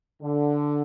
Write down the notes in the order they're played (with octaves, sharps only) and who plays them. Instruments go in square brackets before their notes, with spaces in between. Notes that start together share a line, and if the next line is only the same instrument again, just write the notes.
[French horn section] D3